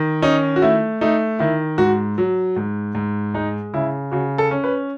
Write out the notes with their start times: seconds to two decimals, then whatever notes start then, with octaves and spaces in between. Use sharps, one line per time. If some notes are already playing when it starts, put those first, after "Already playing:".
Already playing: D#3
0.22 C#4 D#4
0.56 F#4
0.62 A3 E4
1.01 A3 D#4
1.39 D#3 E4
1.78 G#2 F#4
2.18 F#3
2.56 G#2
2.95 G#2
3.34 G#3 D#4
3.74 C#3 E4
4.11 C#3 F#4
4.38 A4
4.51 C#4
4.64 B4